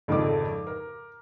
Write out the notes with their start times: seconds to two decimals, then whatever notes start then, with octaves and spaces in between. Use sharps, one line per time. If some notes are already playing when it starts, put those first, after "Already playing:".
0.08 G#1 F2 C#3 F3 A4 D6
0.67 A#4